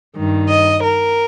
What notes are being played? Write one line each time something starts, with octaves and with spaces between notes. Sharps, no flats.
G2 D#3
D#5
A#4